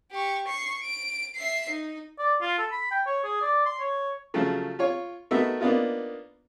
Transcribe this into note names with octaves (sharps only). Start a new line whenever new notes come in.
G4 C#6
C#6 C7
D7
E5 C7
D#4
D5
F4
A4
B5
G5
C#5
G#4
D5
C6
C#5
C#3 F3 F#3 A3
F4 C#5
A3 B3 D#4 F#4 A#4 E5
A#3 B3 D4 D#4 F4